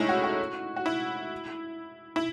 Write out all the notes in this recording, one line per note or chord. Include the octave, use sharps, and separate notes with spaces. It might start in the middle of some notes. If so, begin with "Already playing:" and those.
Already playing: G#3 A3 C#4 D#4 E4
F#4
F#4
F#4
E4
E4